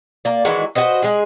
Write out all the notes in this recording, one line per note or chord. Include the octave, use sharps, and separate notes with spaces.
A#3 D5
D#3 E3 G#3 F#4
F#4 B4 C5 D#5
G#3 G#4